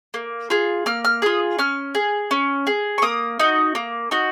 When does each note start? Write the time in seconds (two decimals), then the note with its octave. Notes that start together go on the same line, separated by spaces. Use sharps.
0.14 A#3
0.50 F4 G#4
0.86 A#3 F6
1.05 F6
1.22 F4 G#4 D#6
1.59 C#4 F6
1.95 G#4
2.31 C#4
2.67 G#4
2.98 C#6
3.02 A#3 D#6
3.40 D#4 F#4
3.75 A#3
4.11 D#4 F#4